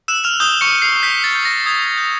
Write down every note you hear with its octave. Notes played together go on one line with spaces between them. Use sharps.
E6 F#6 E7
F6 F7
D#6 G6 G7
C#6 C#7
D#6
C7
G6 B6
A6
G6
A#6
D#6 G#6
A6
G6